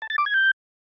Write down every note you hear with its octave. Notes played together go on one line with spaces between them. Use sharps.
A5
A6
D6
G#6
G6